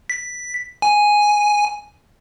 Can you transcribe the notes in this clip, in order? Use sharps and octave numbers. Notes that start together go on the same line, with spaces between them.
B6
G#5